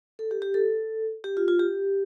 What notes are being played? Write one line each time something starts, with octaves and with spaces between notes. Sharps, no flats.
A4
G4
G4
A4
G4
F4
F4
G4